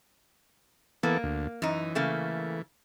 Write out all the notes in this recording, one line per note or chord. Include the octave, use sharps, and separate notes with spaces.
E3 A#3 B3 A4
D2
F#2 E3 D#4
C#3 A3 A#3